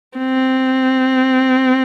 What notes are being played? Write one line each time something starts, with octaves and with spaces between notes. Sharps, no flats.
C4